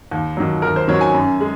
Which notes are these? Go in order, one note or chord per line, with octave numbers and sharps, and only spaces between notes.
D#2
D#3 F#3
D#2 A#4
C5
D#3 F#3 C#5
G#5
F#2
G#3